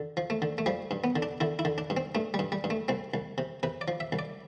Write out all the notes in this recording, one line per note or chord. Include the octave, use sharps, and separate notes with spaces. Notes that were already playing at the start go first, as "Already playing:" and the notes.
Already playing: D3
F3
A3
D3
A3
F3 G3
G2
B3
D3
D4
D3 E4
E4
D3
D4
G2
C4
G2 A3
G3
G2
G3
G2
A3
C2 C4
C2
C3
C3 B4
D5
F3
E5
C2
D5